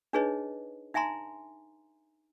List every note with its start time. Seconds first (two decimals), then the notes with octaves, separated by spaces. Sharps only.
0.13 D4 D#4 G#4 B4 C#5 D#5
0.94 D#4 E5 G#5 A#5 C6